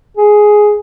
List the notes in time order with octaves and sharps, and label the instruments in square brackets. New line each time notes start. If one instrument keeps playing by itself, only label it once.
[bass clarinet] G#4